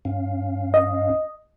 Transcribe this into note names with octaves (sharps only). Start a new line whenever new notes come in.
G2 C#4 F5
D#5